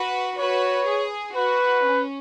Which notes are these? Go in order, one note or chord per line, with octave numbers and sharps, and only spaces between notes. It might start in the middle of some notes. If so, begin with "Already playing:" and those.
Already playing: F#4 B4
F#4 B4 C#5
G#4
F#4 B4
C#4